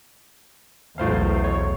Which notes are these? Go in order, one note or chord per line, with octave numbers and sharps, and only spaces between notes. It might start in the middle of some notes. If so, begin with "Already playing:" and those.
B1 E2 A2 C5 F5
C#5